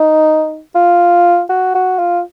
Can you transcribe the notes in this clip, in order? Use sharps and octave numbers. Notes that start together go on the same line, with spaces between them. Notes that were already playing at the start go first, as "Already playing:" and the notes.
Already playing: D#4
F4
F#4
F#4
F4